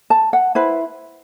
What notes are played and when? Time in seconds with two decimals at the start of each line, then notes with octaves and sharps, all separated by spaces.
0.10 A5
0.33 F#5
0.55 E4 B4 C5